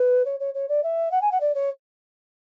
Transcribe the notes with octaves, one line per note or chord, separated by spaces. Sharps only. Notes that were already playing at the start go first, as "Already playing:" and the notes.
Already playing: B4
C#5
C#5
C#5
D5
E5
F#5
G#5
F#5
D5
C#5